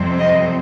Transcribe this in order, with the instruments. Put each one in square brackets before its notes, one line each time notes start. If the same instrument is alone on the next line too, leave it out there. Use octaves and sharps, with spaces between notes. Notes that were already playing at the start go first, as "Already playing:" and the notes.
Already playing: [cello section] F2 C3 G3 C4
D#5